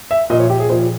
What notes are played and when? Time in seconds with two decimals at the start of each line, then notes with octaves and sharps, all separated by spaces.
0.11 E5
0.30 A#2 F3 D#5
0.39 C#5
0.50 G4
0.60 G#4
0.69 A#2 F3 C5